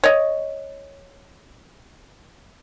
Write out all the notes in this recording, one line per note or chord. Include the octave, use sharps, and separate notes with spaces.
C#5 D#5